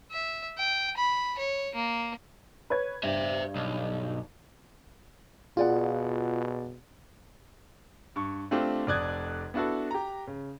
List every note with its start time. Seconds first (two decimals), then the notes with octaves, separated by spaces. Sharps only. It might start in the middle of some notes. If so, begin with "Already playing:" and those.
0.11 E5
0.58 G5
0.97 B5
1.39 C#5
1.75 A#3
2.70 B4 C#5 G#6
3.03 G2 C5 E5
3.56 B1
5.57 B2 F4 G#4 D5 F#5
8.16 G2 C#6
8.51 A3 C4 D4 F4 G4
8.87 F1 F2 D5 D#6 F#6 G#6
9.54 B3 D4 E4 F#4 A4
9.91 G4 A#5
10.27 C#3